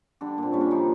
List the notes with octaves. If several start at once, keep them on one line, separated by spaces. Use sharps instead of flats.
D3 G3 D4
A#2 C4
G3 C#4
D4
D#3 F3 D#4